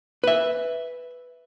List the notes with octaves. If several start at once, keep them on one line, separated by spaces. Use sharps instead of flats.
B4 E5